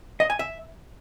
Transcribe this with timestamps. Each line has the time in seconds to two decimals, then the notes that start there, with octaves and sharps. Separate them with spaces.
0.20 D#5
0.30 G#5
0.39 E5